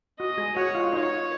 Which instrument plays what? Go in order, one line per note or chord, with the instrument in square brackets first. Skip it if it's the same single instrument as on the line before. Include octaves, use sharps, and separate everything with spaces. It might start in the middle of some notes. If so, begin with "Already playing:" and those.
[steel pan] F#4 [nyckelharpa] D#5
[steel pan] G#3 G#4
[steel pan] F#4 F#5 [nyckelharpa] C#5
[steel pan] F4 F5
F5
[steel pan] D#4 D#5 [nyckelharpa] C#5